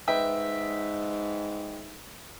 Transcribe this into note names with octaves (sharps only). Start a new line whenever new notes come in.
G#2 B4 D#5 E5 G5